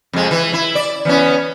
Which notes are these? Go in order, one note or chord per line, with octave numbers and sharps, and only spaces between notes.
F2 G#3
E3
E4
D5
E3 B3 C#4